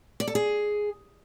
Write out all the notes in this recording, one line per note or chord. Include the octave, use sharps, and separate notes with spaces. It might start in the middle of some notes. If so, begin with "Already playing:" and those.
D5
A4
G#4